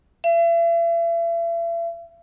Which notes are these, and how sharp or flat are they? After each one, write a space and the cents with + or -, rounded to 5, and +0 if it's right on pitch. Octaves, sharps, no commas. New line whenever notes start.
E5 +40